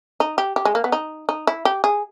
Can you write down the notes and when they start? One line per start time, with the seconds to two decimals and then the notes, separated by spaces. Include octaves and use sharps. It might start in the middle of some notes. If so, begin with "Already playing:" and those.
0.20 D#4
0.38 G4
0.56 G4
0.65 G#3
0.75 A#3
0.84 B3
0.92 D#4
1.29 D#4
1.47 E4
1.65 G4
1.84 G#4